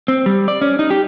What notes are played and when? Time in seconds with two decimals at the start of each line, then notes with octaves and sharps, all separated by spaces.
0.08 C4
0.26 G3
0.48 D5
0.61 C#4
0.79 D#4
0.90 G4